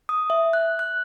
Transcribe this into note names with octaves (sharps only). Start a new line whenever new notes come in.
D#6
E5
F#6
F#6